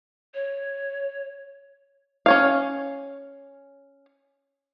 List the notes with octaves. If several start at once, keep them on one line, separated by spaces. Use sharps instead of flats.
C#5
C#4 C#5 F5